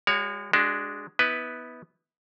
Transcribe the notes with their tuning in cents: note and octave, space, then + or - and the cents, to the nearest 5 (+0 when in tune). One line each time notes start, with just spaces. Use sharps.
G#3 -35 F#4 +0 C#5 +25
G#3 +0 D4 +0 F#4 +40
B3 +0 E4 -35 B4 +0